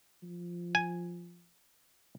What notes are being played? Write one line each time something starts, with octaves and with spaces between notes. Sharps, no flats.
F3
G#5